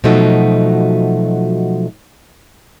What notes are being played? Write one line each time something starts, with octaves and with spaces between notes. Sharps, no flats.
B2 F3 F#3 A3 D#4